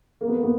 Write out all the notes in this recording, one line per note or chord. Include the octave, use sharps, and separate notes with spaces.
A#3
B3
A#3
B3